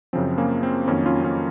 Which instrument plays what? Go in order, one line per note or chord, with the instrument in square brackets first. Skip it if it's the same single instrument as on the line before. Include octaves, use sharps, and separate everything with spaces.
[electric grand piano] F#2 C#3 F3 C4
A#3 C#4
C4
F2 D#3 F#3 A#3 C#4
C#4 F4
C#4 F4